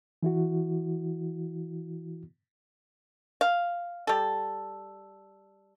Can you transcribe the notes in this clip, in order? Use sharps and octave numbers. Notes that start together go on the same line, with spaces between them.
E3 E4 F#4
F5
G3 A4